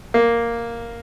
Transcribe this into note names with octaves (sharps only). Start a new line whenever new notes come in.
A#3